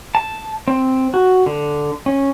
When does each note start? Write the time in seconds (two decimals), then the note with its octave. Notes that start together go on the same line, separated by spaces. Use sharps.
0.15 A5
0.68 C4
1.14 F#4
1.46 D3
2.06 C#4